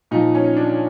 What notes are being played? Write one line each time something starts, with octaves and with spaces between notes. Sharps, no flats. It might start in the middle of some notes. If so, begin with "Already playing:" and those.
A#2 F3 D#4
C#4
D4